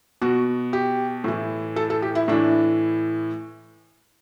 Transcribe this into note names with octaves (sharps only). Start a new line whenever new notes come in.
B2 F#4
G4
A2 E3
A4
A4
G4
E4
A2 E3 D4